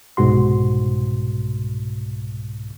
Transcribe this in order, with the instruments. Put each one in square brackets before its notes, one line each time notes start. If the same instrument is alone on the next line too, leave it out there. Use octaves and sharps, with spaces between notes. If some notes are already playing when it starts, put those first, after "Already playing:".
[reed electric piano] C2 G#2 B2 F#4 C6